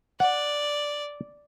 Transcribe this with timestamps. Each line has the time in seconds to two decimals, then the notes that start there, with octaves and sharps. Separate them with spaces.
0.20 D5 F#5